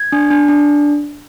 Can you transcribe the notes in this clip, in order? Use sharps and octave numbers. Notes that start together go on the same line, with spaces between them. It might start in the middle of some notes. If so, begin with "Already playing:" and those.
Already playing: G#6
D4
D4
D4